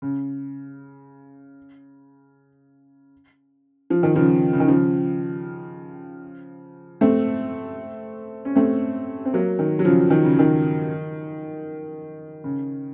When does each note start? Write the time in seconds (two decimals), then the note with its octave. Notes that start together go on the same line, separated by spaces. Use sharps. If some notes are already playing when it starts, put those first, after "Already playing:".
0.02 C#3
3.90 F3
4.03 D#3
4.15 C#3 F3
4.53 C#3
4.60 D#3
4.68 C#3 F3
7.01 A3 C4
8.45 C#4
8.56 A3 C4
9.25 C4
9.33 F#3 A#3
9.59 D#3
9.79 F#3
9.85 C#3 F3
10.10 D#3
10.25 C#3
10.39 D#3
12.44 C#3